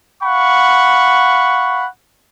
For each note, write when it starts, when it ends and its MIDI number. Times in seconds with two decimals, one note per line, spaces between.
0.23 1.86 77
0.23 1.86 78
0.23 1.86 83
0.23 1.86 85